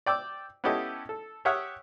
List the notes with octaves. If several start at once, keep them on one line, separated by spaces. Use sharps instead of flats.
D5 G5 D6 E6
B3 C#4 E4 G4 A4 D#5
A4
G4 C#5 E5 F#5 D#6 F6